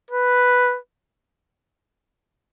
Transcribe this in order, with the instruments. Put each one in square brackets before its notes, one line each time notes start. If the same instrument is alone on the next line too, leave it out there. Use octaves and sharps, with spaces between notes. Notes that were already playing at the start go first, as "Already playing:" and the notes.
[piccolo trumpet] B4